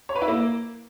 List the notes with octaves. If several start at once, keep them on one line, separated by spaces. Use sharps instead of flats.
C#5
B4
E4
A#3